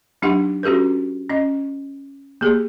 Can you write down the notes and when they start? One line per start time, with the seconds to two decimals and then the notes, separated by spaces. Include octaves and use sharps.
0.22 F#3 D4 D#4 G4 F#5
0.63 C#4 F#4 G4 A4 B4
1.30 C#4 D#5
2.41 A#3 G4 G#4